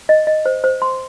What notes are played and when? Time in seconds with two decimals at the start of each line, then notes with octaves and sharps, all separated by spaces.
0.09 D#5
0.27 D#5
0.46 C5
0.64 C5
0.82 C6